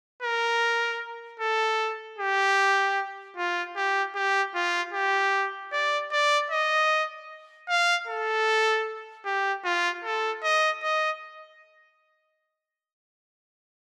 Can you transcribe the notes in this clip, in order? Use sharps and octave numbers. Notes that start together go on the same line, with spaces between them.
A#4
A4
G4
F4
G4
G4
F4
G4
D5
D5
D#5
F5
A4
G4
F4
A4
D#5
D#5